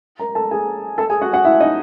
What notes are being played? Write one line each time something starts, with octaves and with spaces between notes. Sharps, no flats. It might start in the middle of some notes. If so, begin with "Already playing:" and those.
A#4 A#5
A4 A5
G#4 G#5
A4 A5
G#4 G#5
F#4 F#5
F#4 F#5
E4 E5
D#4 D#5